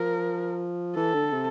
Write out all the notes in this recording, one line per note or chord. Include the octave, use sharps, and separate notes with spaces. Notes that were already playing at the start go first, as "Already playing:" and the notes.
Already playing: F3 A#4
E3 A4
D3
C3